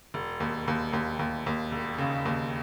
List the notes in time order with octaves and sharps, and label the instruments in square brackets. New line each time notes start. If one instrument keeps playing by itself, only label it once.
[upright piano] E1
D#2
D#2
D#2
D#2
D#2
E1
C#3
D#2